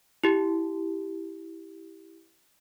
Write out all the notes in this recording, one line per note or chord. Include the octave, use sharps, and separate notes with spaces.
E4 G4